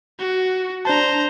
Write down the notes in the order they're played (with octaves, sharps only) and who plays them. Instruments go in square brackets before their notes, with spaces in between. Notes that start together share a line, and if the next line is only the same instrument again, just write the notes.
[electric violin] F#4
[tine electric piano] D4 A5 [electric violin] C5 A#5